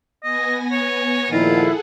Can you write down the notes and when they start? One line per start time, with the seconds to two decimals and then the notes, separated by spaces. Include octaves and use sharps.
0.23 B3 D#5 G#5 A#6
0.71 C#5
1.31 A#2 D#3 F3 E4 F4 G#4 A4 F#5